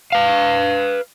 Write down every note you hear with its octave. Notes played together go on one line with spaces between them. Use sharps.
B4 F5